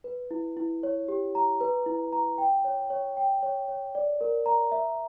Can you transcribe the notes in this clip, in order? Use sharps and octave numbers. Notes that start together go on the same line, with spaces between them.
B4
E4
E4
C#5
G4
A#5
B4
E4
A#5
G5
C#5
C#5
G5
C#5
C#5
D5
A#4
A#5
E5